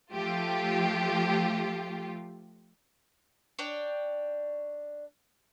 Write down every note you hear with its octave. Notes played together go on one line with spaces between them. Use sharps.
F3 A3 F4 G4
D4 C#5 D5 G5